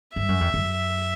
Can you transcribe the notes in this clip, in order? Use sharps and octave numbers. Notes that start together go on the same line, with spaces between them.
G2 E5
F#2
F2
F#2